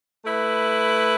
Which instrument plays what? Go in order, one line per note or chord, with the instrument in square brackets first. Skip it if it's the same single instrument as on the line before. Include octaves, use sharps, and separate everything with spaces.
[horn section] A3 E4 B4